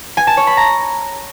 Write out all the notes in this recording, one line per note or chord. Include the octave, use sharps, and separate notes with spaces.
G#5
A5
C#5
B5
A#5